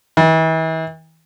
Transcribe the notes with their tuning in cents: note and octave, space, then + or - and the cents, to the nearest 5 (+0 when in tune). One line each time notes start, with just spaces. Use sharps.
E3 -40